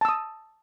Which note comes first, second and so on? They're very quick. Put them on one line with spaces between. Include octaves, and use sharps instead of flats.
A5 E6 D#6